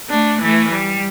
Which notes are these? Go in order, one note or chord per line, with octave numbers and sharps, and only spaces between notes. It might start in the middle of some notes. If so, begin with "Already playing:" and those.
A3 D4
E3 A3
G3